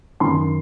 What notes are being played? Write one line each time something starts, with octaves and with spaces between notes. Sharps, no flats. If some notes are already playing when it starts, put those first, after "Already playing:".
F#2 D#3 C6